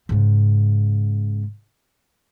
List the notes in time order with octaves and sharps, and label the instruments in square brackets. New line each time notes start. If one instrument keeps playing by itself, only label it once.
[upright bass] G#2 C#3